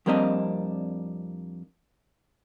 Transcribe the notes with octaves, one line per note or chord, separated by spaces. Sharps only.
F2 G3 A#3 C4 D4 D#5